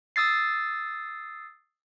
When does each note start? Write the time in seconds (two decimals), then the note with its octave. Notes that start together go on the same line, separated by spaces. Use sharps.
0.16 D#6 E6 A6 C7